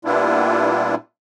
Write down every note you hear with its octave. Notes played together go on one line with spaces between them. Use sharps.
A#2 G3 B3 D4 E4 F4